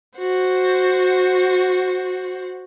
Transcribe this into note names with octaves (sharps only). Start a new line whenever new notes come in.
F#4 C5